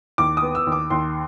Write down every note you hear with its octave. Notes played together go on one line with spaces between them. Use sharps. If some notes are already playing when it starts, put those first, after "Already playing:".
D#2 D6
D#6
B3
E6
D#2
D6
D#2 C6